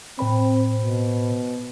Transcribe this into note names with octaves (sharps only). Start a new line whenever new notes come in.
A2 C4 C5 B5
B2